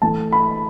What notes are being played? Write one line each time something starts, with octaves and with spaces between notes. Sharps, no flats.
A2 E3 A3 A5
B5